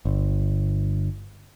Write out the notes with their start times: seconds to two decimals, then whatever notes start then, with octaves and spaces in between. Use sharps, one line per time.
0.05 G1